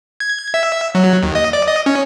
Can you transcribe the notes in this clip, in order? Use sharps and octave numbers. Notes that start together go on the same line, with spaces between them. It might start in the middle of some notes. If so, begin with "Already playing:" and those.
G#6
E5
F#3
D#2
D#5
D5
D#5
C#4